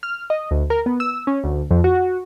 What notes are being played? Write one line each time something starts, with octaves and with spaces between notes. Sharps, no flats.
F6
D#5
D2
A#4
B3
E6
C#4
D2
F2
F#4